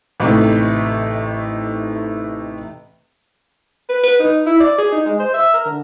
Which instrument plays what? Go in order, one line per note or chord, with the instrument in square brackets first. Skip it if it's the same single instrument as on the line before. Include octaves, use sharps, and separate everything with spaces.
[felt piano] A1 C3 A3 D#4
[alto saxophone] B4
B4
D#4
E4
D5
G#4
D#4
G#3
C5
E5
A#4
D3